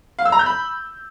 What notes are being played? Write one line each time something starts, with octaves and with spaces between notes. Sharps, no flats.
F5
E6
A#5
G6
B5